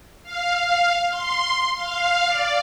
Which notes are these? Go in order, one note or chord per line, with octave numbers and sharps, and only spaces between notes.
F5
F5
C6
F5
D5